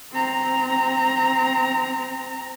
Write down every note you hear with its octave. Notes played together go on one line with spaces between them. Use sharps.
C4 A#5